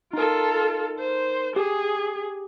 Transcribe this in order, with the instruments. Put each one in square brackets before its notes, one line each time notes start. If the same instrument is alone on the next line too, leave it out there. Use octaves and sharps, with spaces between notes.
[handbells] D#4 A#4 [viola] F4 A4
[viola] C5
[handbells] G4 [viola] G#4